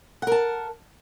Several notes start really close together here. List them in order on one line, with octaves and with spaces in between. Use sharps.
F#5 A#4 A5